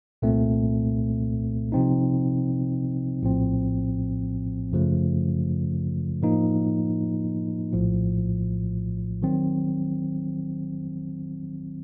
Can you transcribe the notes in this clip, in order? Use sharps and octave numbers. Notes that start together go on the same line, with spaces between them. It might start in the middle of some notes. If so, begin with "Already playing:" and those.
C2 A#2 A3 C4
C3 F3 C4 D#4
A#1 A2 F3 C4
F#2 C#3 F3 A3
A2 F3 A#3 D#4
A#1 A2 F3
D#3 F#3 C4